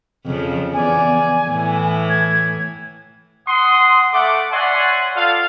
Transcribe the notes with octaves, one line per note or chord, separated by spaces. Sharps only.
F2 C#3 F3
E2 D5 G#5
A2 E3
G#6
F#5 C6 D#6
A3 F#5 D6
C#5 D5 E5 F#5 G#5 C6
F4 A4 D5 F5